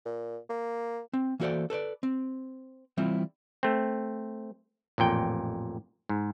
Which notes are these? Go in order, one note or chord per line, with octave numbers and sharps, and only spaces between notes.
A#2
A#3
C4
E3 A#3 F#4 A4 C5 D5
A4 B4 C#5 D5
C4
E3 G3 C4 E4 F4
A3 C4
A1 F2 A#2 G5
G#2